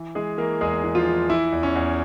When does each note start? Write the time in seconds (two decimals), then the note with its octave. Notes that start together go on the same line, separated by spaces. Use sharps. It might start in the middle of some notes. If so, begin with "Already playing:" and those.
Already playing: E3
0.15 E3 G#3 G#4
0.38 E3 A#3 A#4
0.61 E2 G#3 G#4
0.84 E3
0.95 F3 F4
1.07 E3
1.29 E3 E4
1.52 E2
1.63 C#4
1.75 E2